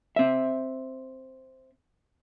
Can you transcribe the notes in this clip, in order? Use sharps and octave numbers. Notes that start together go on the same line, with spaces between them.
C4 E5